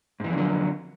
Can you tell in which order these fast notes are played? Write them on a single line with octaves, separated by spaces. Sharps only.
G#2 E3 F2 D3 F#3